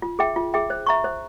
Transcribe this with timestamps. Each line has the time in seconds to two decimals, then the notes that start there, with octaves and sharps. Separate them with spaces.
0.02 F4
0.19 G#4 E5 G5
0.36 F4
0.54 G#4 E5 G5
0.70 C5
0.86 E5 A#5 C#6
1.04 C5